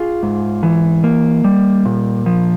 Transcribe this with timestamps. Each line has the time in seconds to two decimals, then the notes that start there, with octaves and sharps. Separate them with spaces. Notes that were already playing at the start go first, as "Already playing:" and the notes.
Already playing: F4 G#4
0.23 G#2
0.63 E3
1.04 A#3
1.44 G3
1.85 A#2
2.26 F3